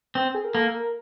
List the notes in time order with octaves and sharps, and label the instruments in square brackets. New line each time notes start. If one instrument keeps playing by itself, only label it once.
[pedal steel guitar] C4
[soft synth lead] G#4
A#4
[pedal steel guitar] A#3 [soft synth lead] A4
[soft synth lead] A#4